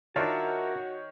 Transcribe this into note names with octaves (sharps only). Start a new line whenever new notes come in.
D#3 D4 F4 F#4 A#4 C#5 E5 A5